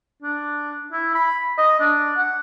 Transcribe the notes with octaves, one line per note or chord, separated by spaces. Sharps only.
D4
E4
B5
D#5
D4
F#5